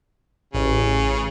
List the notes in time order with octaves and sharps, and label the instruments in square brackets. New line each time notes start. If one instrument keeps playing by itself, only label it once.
[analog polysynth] A1 [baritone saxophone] C#3